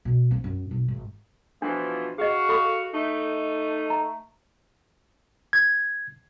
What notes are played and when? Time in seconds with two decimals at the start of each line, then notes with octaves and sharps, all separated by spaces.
0.05 B2
0.31 C4
0.44 F#2
0.71 B1
0.88 G#1
1.62 B2 E3 F3 D4
2.18 F#4 G#4 D#5 F5
2.49 A4 B5
2.93 A3 D#4
3.90 A#5
5.53 G#6